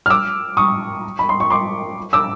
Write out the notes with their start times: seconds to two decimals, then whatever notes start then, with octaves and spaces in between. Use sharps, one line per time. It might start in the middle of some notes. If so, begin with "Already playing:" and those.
0.06 F6
0.10 D6 E6
0.57 C#6 D#6
1.19 B5
1.29 C6
1.40 C#6
1.50 C6 D6
2.13 D6 E6